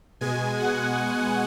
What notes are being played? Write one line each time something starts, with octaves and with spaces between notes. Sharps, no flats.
B2 G#3 G#5
F#5